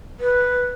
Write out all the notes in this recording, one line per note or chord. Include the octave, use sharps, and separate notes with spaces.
B4